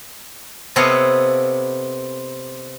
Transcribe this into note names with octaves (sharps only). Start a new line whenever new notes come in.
C3 B3 A4 C#5 D#5 F5